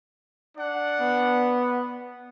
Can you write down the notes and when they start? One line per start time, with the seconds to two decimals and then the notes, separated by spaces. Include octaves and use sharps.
0.58 D4 D5 F#5
1.01 B3